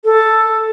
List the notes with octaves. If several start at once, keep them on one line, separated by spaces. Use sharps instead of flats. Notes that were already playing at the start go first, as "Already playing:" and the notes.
A4